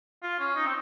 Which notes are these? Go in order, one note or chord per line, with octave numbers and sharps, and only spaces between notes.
F4
C#4
D#4
C4